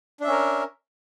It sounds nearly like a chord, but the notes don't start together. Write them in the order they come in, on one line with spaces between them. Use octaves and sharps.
D4 E5 C#4 A#4